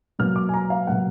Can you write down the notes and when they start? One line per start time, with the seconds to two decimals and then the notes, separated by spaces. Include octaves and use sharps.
0.19 B2 F#3 A#3 F6
0.36 D6
0.49 G#5
0.54 A#5
0.70 F5
0.87 B2 F#3 A#3 F#5